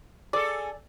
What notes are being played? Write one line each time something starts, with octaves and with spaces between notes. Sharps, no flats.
G#4 A4 D5